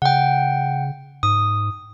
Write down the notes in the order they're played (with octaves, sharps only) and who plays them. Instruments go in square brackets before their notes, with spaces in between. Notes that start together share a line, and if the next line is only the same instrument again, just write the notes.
[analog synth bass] C#3 [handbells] F#5 G5
[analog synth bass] G#2 [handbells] D#6